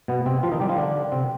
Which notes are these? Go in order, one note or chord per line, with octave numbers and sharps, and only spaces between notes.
B2 B3
C3 C4
F3 F4
D#3 D#4
G3 G4
F3 F4
D3 D4
C3 C4